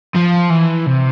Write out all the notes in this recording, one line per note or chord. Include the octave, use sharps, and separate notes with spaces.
F3
E3
C3